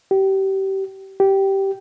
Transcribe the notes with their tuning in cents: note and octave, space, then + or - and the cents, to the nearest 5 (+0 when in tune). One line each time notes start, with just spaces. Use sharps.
G4 -25
G4 -10